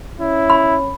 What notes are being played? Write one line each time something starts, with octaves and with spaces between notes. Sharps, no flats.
C#4 E4
B5